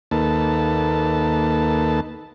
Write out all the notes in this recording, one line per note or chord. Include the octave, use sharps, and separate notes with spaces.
D#2 A#3 D#4 A4 B4 A5